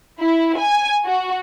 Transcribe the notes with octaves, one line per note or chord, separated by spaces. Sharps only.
E4
G#5
F#4